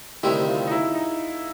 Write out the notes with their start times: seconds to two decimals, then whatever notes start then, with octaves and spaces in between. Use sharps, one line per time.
0.23 D2 C3 D#3 G3 C4 E4
0.48 F4
0.67 D#4
0.71 E4
0.95 D#4